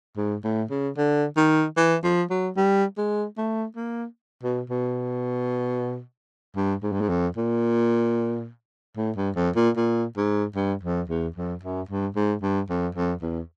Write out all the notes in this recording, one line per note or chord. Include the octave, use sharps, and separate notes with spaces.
G#2
A2
C#3
D3
D#3
E3
F3
F#3
G3
G#3
A3
A#3
B2
B2
G2
G#2
G2
G#2
F2
A#2
A2
G2
F2
A#2
A#2
G#2
G2
F2
E2
F2
F#2
G2
G#2
G2
F2
F2
E2